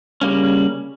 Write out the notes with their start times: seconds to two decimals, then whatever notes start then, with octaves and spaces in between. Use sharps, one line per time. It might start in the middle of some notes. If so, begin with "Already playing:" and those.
0.21 C#3 G3 A#3 C#4